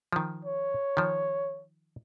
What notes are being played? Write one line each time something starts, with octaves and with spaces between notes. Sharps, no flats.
D#3 F3
C#5
D#3 F3